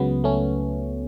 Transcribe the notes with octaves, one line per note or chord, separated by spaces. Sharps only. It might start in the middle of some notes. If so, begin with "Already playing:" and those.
Already playing: C#2 C#3 F#3 B3
A3 C#4